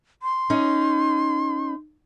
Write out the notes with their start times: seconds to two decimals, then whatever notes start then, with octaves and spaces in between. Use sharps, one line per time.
0.23 C6
0.50 C#4 D#4